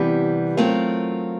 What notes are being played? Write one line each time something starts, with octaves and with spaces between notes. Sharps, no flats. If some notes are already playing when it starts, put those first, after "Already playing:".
Already playing: C3 E3 G3 B3
F#3 A3 C4 F4 A#4